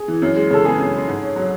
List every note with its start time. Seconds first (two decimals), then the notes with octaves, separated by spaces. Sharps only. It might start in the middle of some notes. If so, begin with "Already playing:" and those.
Already playing: G#4
0.08 E3
0.22 F#2
0.36 G#3
0.50 C#3 A4
0.65 B3 G#4
0.80 F#2
0.93 G#3
1.07 G#2
1.23 C#4
1.36 F#3